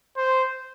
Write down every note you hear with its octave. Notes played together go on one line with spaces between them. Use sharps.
C5